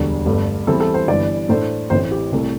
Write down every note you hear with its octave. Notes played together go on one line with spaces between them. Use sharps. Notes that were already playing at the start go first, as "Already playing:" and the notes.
Already playing: E1 D2 D3 G3
G1 G2 D3 A3
E2 E3 G3 C4 E4 A4
A4
C5
G1 G2 E3 D5
A2 A3 D4 C5
A1 A2 E3 C4 C5
G4
C2 C3 A3